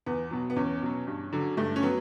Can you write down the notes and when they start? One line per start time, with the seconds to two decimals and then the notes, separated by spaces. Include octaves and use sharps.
0.06 E2 B3
0.31 B2 F#3
0.50 B3
0.56 E2 C#4
0.82 B2 F#3
1.07 G2
1.33 D3 F#3
1.57 G2 A3
1.76 C#4
1.83 F#3 B3